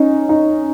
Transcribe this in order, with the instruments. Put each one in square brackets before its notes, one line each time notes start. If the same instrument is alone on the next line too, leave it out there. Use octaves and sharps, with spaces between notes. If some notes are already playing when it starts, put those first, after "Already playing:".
Already playing: [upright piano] C#4 D#4
D#4